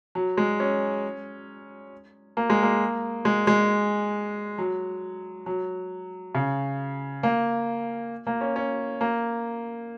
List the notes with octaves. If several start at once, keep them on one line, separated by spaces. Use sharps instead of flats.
F#3
G#3
C#4
A#3
G#3
A#3
G#3
G#3
F#3
F#3
C#3
A#3
A#3
C#4
C#4
A#3